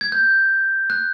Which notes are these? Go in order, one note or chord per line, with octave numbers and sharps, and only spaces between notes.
G#6
G6
F#6